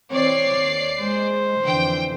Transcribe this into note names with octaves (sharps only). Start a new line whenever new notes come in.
E3 C4 C#5 D5 C7
D#2
G#3 C5
F2 D3 E3 G5